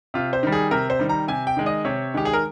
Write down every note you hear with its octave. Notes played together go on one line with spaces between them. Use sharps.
C3 F4
C5
D#3 G3
G#4
C3 A#4
C5
D#3 G3
A#5
C3 G#5
G5
D#3 G#3
D#5
C3 C#5
D#3 G#3 G4
G#4
A#4